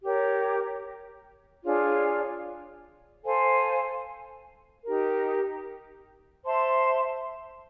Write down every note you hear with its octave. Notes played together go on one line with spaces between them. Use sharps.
G4 A#4 C#5
D4 F4 G#4 C#5
A4 C5 F5 G#5
D#4 G4 A#4
C5 E5 A5 C6